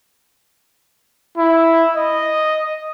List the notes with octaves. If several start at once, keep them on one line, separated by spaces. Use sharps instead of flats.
E4
D#5